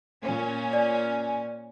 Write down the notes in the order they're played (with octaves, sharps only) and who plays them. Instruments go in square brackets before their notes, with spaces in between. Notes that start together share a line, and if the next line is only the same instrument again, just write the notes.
[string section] A#2 C#4
[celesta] D5